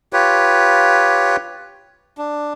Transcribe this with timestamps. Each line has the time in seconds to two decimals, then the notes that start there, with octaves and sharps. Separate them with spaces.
0.13 F4 G4 B4 C#5
2.18 D4